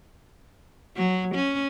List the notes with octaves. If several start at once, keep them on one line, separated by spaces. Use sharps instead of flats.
F#3
C#4